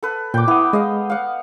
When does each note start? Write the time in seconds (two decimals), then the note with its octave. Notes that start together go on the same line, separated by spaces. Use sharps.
0.03 A4 B4
0.34 A#2 G5 D6 G6
0.48 B3 E4 D#6
0.73 G#3 D#5 F5
1.10 F5 F#5